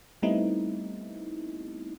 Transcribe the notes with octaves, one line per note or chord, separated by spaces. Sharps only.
G3 A3 B3 C4 D#4 E4